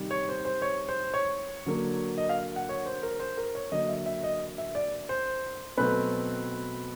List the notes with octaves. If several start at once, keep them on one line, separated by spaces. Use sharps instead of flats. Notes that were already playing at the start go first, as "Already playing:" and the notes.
Already playing: C3 D#3 G3
C#5
C5
C5
C#5
C5
C#5
D3 F#3 A#3
D#5
F5
F#5
C#5
C5
A#4
C5
A#4
C#5
D3 F#3 A#3 D#5
E5
E5
D#5
E5
D5
C5
B2 F#3 A3 C4 B4